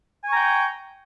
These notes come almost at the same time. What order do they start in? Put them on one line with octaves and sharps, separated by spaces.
G#5 C#6 A#5 G5